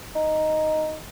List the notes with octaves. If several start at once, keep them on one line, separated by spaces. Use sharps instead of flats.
D#4